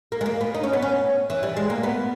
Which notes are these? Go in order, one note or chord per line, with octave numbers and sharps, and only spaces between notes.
A#3
G#3
A#3
B3
D#4
C#4
B3
C#4
E3
G3
G#3
A#3
B3